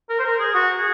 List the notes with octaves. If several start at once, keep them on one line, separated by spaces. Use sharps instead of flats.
A#4
C5
A#4
G#4
F#4
G#4